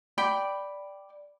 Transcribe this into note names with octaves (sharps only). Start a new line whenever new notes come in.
D5 G5 B5